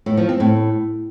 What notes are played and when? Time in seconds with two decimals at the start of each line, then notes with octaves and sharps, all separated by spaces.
0.06 A2
0.17 F3
0.29 C4
0.40 A2